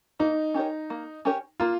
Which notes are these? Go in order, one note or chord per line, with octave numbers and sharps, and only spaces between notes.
A#3 D#4
C#4 G4 A#4 C#5
A#3
C#4 G4 A#4 C#5
A#3 F4